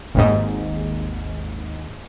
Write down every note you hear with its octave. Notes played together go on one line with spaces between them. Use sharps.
G#1 D#2 G#2